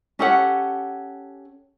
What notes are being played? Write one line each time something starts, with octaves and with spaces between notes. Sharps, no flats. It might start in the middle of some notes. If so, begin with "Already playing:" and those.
C#4 G4 A4 F#5